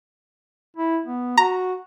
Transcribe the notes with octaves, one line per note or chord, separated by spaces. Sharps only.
E4
B3
F#4 A#5